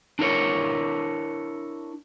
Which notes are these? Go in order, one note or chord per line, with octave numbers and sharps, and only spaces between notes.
D4 E4 A#4 C#5